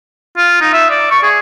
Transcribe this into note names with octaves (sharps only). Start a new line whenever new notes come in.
F4
D#4
E5
D5
C#6
G#4